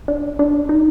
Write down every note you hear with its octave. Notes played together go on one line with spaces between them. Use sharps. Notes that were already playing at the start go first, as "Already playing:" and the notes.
D4
D4
D#4